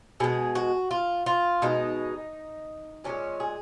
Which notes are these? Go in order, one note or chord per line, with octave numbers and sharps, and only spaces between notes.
B2 G#3 G#4
F#4
F4
F4
B2 G#3 D#4
A#2 F3 G#3 C#4
G#4